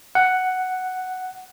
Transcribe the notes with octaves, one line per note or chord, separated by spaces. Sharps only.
F#5